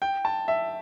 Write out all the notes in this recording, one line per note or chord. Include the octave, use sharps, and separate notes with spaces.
G5
A5
E5